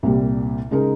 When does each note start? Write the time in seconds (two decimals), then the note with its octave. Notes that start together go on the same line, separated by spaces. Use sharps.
0.03 C2 A#2 G3
0.71 C#3 G#3 D#4 A#4